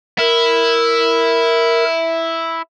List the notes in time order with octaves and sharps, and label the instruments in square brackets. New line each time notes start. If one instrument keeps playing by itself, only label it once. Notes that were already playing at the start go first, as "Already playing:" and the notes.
[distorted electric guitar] E4 [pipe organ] A#4